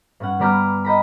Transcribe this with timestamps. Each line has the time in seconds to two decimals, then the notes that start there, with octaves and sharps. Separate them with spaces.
0.20 G2 C#4 F#5
0.39 G3 B3 D5 A#5 F6 G6
0.85 D#5 G5 A#5 B5